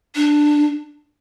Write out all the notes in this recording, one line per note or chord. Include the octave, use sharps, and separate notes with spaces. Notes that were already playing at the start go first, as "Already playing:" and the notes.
D4